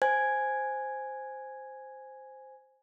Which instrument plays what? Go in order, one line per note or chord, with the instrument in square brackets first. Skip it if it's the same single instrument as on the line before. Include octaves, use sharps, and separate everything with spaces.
[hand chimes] C5 G#5 G#6